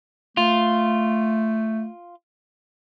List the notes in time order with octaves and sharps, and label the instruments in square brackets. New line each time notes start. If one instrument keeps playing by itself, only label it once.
[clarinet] A3 [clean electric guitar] F4